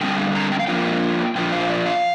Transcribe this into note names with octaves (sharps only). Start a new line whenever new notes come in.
D3 G3 C4 G5
F5
A#5
G5
F5
F3 A#3 D4 F4 G5
A#2 F3 D4 F4 G5
F5
C5
D5
F5